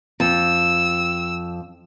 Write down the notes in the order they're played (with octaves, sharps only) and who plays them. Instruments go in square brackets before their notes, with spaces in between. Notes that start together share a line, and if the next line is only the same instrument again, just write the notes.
[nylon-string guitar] F2 [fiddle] E6